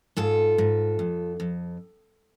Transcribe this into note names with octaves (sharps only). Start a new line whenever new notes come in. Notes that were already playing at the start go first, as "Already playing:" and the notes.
G#2 F4 A4
G#2
F2
F2